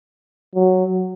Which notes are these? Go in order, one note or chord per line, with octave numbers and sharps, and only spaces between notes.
F#3